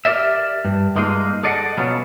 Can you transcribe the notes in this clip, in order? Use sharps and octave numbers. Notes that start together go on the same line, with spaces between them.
G4 A#4 D5 E5
G2
G2 G#3 A#3 D#4 F4
G#4 A4 D5 D#5 F5 F#5
B2 F#3 B3 C#4 F4